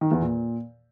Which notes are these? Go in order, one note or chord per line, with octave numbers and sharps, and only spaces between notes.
D#3
E2
A#2